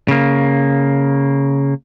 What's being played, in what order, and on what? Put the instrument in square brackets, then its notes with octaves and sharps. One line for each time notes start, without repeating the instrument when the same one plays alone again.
[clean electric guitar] C#3 A#3